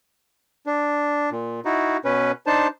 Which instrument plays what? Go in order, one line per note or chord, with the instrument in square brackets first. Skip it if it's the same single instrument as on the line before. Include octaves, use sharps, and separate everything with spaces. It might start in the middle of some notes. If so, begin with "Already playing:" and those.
[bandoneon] D4
A#2
D#4 E4 F#4
B2 C#4 B4
D4 D#4 C5 A5